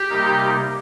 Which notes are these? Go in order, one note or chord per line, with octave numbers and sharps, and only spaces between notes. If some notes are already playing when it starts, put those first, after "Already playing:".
Already playing: G4
C3 G3 A#3 D#4 A#4